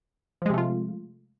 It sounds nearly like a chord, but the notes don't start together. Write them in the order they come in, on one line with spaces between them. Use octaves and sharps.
F3 G#3 C3 A3 F4